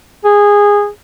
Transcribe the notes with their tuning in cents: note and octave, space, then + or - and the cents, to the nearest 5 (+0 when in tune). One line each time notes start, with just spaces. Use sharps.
G#4 -15